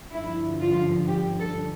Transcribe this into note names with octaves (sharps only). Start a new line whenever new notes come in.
G2 D3 F3 E4
F4
G4
A4